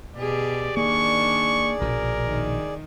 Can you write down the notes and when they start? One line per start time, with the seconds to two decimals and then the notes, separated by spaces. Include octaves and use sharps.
0.16 B2 G4 G#4 D5
0.77 D#3 A#3 D4 G#4 D5 C#6
1.81 A#1 B2 F3 A#4
2.26 D#3